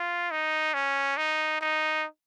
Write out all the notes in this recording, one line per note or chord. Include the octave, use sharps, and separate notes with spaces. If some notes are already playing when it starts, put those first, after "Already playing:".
Already playing: F4
D#4
C#4
D#4
D#4